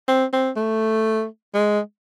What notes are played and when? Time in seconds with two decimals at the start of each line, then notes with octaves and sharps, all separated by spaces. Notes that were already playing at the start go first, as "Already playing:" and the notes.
0.08 C4
0.33 C4
0.56 A3
1.54 G#3